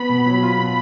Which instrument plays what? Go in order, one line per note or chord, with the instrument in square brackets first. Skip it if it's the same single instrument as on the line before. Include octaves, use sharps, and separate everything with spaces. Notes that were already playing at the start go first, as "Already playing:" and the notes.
Already playing: [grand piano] B3 [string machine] B5
[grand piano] B2
F#3
F4
B2